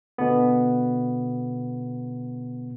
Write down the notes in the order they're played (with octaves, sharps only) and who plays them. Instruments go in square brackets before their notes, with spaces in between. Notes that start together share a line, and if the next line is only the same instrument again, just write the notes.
[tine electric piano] B2 D3 B3